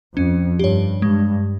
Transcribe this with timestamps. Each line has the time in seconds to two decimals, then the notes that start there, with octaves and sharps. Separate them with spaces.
0.16 F2 C#4
0.59 G2 G4 C#5
1.02 G2 G#3